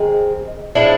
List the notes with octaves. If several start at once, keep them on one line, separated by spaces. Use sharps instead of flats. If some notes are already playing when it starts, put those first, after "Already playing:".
Already playing: D#3 G#3 C4 G#4
A2 F3 G#3 D4 E4